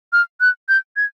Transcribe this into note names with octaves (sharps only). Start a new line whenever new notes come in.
F6
F#6
G6
G#6